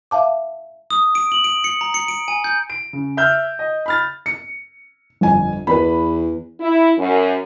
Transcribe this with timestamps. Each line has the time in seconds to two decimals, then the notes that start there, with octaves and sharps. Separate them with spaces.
0.11 E5 F5 A5 D6
0.90 D#6
1.15 D7
1.32 F#7
1.44 D7
1.64 C#7
1.81 A#5
1.94 C#7
2.08 D7
2.28 G#5
2.44 G6
2.70 D7
2.93 C#3
3.17 E5 E6 F6 G6
3.59 D#5
3.86 B5 F6 A6
4.26 C#7
5.21 G1 F2 G#5
5.67 E2 B4 B5
6.60 E4
6.98 F#2